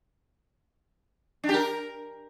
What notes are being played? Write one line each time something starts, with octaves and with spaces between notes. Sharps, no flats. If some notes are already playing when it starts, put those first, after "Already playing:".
D4
G4
A#4